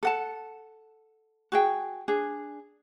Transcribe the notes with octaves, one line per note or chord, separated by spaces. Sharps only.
A4 F#5 A5
F#4 G#4 G5
D4 G#4